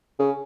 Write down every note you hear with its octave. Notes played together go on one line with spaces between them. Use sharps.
C#3